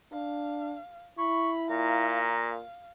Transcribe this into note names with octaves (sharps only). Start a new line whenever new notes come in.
D4 F5
E4 B5 C#6
A#2 F5 A#5